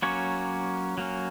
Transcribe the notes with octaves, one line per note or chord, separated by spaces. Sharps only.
F#3 A#3 C#4 C#5
F#3 A#3 C#4